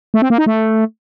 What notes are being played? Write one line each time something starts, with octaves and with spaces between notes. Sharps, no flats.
A3
C4
A#3
D#4
A3